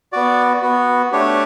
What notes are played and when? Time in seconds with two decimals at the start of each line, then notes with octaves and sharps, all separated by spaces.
0.12 B3 F#4 D5
0.62 B3 F#4
1.12 A3 D4 G4 C#5